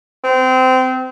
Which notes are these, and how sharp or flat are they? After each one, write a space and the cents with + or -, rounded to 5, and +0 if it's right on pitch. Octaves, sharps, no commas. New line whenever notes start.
C4 -25